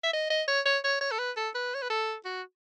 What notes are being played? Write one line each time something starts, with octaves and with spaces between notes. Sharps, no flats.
E5
D#5
D#5
C#5
C#5
C#5
C#5
A4
B4
A4
B4
C#5
B4
A4
F#4